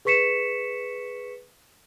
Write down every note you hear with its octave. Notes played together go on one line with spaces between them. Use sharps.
G#4 B4 C#6 B6 C#7 E7